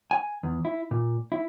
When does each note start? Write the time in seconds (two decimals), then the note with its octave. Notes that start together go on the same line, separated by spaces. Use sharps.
0.11 G#5
0.43 E2
0.65 E4
0.91 A#2
1.32 E4